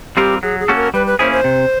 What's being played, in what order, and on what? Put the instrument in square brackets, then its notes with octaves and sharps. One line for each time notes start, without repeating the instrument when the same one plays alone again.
[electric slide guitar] G3 C4 F4 A#4 [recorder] G4
[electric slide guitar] F#3 [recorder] G#4
[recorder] G#4
[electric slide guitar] A#3 C#4 F#4 A4
[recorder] A#4
[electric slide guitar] G3 [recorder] B4
[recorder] B4
[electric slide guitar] A#3 C#4 E4 G#4 [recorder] C5
[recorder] C5
[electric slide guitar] C3